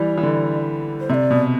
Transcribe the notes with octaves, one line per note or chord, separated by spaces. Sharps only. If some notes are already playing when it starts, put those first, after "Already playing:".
Already playing: E3 G3 D5
E3
D3
C5
C3 D5 E5
B2